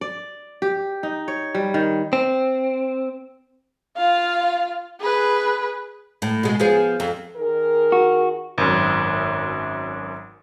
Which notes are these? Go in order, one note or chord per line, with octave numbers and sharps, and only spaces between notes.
D5
G4
D#4
C#5
G3
D#3
C4
F4 F5
G#4 B4
A2
B2 G#3
F3 B3 G#4
F2
D#3 G#4 A#4
F#4
G#1 F#2